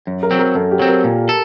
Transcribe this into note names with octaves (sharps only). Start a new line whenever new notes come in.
F#2
A#4
F#3 C4
A#4
F#2 A4
G4
F#3 C4
A#4
A#2
A4